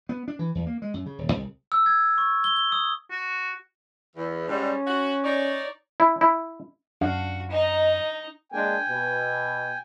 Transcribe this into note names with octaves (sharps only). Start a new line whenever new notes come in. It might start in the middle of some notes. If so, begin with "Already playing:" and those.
B3
D4
E3
E2
A#3
G#3
F#2
C#3
D#1
C2
E6
G#6
C#6
G7
G7
D#6
F#4
E2
G#2 G3 C#4
F#4
D#4 C#5 D5
E4
E4
F#2 D4 F#4 F5 F#5
D#4 D#5 A#5
G#3 A#3 D4 G5 G#5
B2